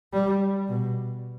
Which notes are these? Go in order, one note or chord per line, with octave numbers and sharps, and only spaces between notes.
G3
B2